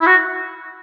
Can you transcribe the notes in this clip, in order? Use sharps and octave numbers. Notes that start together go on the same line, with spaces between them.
E4
F#4